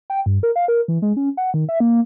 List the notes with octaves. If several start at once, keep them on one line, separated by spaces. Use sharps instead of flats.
G5
G2
A#4
F5
A#4
E3
G#3
C#4
F#5
D#3
E5
A#3